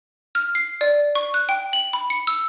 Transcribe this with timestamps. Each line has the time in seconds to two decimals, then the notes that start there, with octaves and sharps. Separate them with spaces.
0.35 F6
0.55 C7
0.81 D5
1.15 C#6
1.34 F#6
1.49 G5
1.73 F#7
1.93 B5
2.10 C#7
2.27 E6